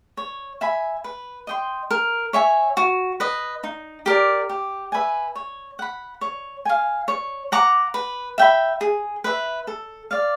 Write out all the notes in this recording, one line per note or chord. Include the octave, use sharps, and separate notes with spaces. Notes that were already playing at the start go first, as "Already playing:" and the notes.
C#5
E5 G#5 B5
B4
D#5 G5 C6
A#4
C#5 E5 G#5
F#4
B4 D#5
D#4
G4 A#4 D5
G4
B4 E5 G#5
C#5
F#5 B5
C#5
F5 G#5
C#5
F#5 A#5 D6
B4
E5 G5 B5
G#4
B4 E5
A4
D5 F5